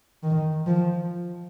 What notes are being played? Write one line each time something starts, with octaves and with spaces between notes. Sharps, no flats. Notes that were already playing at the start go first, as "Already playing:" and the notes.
D#3
F3